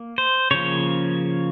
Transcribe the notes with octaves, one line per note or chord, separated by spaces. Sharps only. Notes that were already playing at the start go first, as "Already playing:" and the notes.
Already playing: A#3
C5
C#3 F3 A#3 C#5